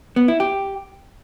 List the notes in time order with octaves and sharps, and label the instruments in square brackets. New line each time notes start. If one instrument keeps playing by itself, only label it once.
[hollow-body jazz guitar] B3
E4
G4